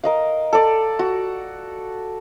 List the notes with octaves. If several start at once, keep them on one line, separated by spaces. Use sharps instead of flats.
A#4 D#5 F5
A4 D5
F#4